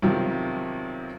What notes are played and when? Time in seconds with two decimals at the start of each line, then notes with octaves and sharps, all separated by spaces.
0.02 B1 C3 D#3 F3